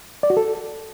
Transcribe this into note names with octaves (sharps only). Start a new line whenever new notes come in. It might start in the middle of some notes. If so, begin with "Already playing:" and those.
D5
F#4
A4